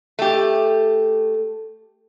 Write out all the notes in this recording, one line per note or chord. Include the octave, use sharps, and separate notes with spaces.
A3 G4